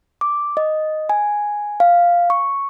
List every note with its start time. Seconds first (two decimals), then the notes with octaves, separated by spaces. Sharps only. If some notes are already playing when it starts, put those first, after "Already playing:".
0.21 D6
0.57 D#5
1.09 G#5
1.80 F5
2.30 C#6